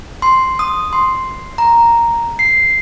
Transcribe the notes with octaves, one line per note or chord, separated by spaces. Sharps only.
C6
D#6
C6
A#5
C7